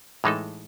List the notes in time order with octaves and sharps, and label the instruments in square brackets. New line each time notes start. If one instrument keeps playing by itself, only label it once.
[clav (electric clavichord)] A2 E3 G#3 D#4 A4